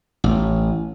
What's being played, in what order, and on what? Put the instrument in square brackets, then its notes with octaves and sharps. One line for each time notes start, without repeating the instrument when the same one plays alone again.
[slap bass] A1